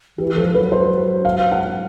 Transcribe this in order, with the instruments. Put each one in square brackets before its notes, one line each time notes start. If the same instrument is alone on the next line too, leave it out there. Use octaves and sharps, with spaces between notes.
[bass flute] E3 [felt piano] G4
[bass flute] F3 [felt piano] A4
[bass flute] F#3 [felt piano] B4
[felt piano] C5
F5
F#5